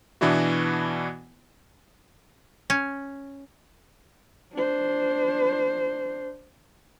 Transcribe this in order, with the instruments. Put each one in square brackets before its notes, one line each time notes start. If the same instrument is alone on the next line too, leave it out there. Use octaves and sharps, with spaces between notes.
[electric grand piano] B2 E3 B3 D4 E4 F#4
[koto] C#4
[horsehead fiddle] D4 C5